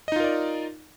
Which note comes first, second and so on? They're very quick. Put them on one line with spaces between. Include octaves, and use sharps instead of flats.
D#5 D#4 F4 A#4 D5